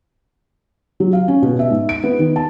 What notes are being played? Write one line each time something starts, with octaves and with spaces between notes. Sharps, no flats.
F#3
F5
C#4
B2
E5
G#2
D7
B3
D#3
A5